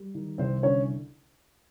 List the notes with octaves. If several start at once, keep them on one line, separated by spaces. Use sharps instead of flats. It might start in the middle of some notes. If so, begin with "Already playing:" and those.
Already playing: G3
D#3
C2 C4 C5
D3 C#4 C#5